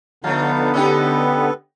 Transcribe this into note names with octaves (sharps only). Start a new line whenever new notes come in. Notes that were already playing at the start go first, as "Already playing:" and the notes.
D3 F3 A3 B3 D#4 F5 A5
C#4 D#4 G4 A4 B4